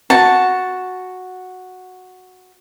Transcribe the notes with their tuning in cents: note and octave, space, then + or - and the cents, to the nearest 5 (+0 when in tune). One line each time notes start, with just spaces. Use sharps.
F#4 -5 A5 +0